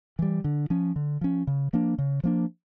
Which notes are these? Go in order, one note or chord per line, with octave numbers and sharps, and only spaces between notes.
E3 G3
D3
F3 C#4
D3
F3 C#4
C#3
F3 A#3 D4
C#3
F3 A#3 D4